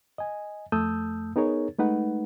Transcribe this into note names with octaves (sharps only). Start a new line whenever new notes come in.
D#5 G#5
F2 A3 A5 D#6 E6 G6
B3 D#4 G#4 A#4 C#5
G#3 A3 D#4 B4 F#5